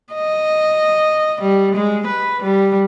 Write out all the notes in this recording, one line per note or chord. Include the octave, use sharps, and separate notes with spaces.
D#5
G3
G#3
B4
G3